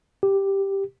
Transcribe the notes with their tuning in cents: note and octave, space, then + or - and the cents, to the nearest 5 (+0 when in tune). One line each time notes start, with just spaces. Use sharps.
G4 +0